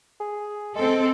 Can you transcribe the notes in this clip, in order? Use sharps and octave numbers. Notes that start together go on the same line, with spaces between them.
G#4
G#3 C4 A4